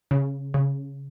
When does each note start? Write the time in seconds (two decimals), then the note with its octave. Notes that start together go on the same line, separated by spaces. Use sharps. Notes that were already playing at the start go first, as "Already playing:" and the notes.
0.11 C#3
0.54 C#3